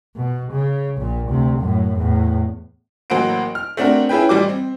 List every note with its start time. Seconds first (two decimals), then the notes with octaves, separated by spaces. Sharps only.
0.15 B2
0.52 C#3
0.98 A#1 A#2
1.28 D2 C3
1.59 F#2 A2
1.97 E2 A2
3.10 A1 F#3 A#3 F#4 C5 D7
3.55 F6
3.77 A3 C4 D4 F#4 A#4
4.09 C#4 E4 G#4 B4 G5
4.29 A1 G3 D6
4.49 C4